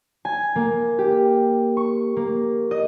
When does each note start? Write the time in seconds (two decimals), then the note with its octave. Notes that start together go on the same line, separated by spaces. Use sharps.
0.25 G#5
0.55 A#3
0.98 G4
1.77 C#6
2.16 A#3
2.71 D#5